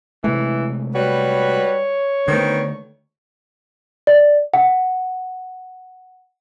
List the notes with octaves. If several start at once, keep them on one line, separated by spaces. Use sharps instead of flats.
C3 E3 G#3 A3
G3 F#4 B4 C#5
D3 D#3 A3 B3 C4
D5
F#5